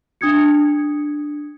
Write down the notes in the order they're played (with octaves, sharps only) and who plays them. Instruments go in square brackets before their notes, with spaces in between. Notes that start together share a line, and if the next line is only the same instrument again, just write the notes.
[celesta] D4 D#6 G#6 C#7